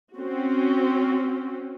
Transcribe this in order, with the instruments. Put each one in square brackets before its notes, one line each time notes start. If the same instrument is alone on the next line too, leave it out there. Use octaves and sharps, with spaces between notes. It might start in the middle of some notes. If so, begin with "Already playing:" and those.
[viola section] C4 C#4 F#4